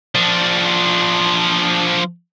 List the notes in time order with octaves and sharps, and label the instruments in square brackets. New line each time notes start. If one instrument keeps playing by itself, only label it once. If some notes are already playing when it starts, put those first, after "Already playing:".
[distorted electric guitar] F3 D4